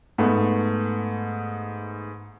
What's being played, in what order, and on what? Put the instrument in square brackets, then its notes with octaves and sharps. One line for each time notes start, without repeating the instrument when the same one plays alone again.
[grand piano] G#2 A3 B3